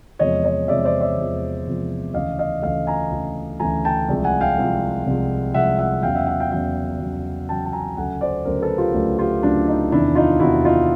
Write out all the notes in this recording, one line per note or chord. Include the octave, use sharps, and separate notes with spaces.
E2 C3 F3 G#3 C#5 D#5
C#5 D#5
E2 C3 F3 G#3 D5 E5
C5 D5
D5 E5
E2 C3 F3 G#3
E2 C3 F3 G#3
D2 C#3 E3 A3 D#5 F5
D#5 F5
D2 C#3 E3 A3 D#5 F5
G#5 A#5
D2 C#3 E3 A3
D2 C#3 E3 A3 G#5 A#5
G5 A5
C2 C3 F3 G#3
F#5 G#5
F5 G5
C2 C3 F3 G#3
C2 C3 F3 G#3
C2 C3 F3 G#3 E5 F#5
E5 F#5
E2 C#3 F#3 F5 G5
E5 F#5
E5 F#5
F5 G5
E2 C#3 F#3 F5 G5
E2 C#3 F#3
E2 C#3 F#3 G5 A5
A5
G#5 A#5
D2 C#3 F#3 A3 F#5 G#5
C5 D5
D2 C#3 F#3 A3 A#4 C5
A4 B4
F4 G4
D2 C#3 F#3 A3
F4 G4
D2 C#3 F#3 A3 D4
D#4
E2 C3 D#3 D4 E4
D#4 F4
E2 C3 D#3 E4 F#4
D#4 F4